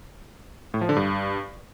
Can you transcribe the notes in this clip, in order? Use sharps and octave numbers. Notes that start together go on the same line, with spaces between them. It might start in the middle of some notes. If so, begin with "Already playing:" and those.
A2
F3
D3
G2